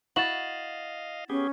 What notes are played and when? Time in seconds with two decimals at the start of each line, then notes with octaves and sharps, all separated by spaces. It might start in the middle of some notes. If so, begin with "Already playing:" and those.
0.16 E4 F#4 D#5 F5 A6 E7 F#7
1.30 B3 C#4 G4 G#4